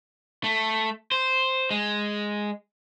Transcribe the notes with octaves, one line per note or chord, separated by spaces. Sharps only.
A3
C5
G#3